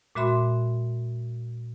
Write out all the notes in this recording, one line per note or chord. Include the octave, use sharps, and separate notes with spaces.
A#2 G#3 F#4 E5 B5 C6